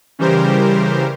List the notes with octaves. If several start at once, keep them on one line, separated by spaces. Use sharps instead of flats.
C#3 E3 G3 G4 A#4 C5